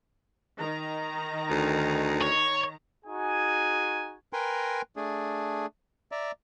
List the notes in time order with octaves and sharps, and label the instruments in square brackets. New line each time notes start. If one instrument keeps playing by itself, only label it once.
[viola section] D#3 A#5
[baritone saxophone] D2
[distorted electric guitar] C#5
[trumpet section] D#4 F#4 G#4 G#5
[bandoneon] A#4 B4 G5 G#5 A#5 C6
A3 D4 G#4
D5 E5 A#5